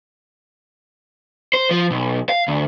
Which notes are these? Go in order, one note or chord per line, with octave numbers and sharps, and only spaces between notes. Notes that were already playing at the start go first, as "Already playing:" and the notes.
C5
F3
B1
F5
D2